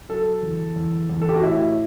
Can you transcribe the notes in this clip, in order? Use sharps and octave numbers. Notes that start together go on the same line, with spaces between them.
F#3 A4
E2
E2
E2
A4
G4
F#4
A2 E4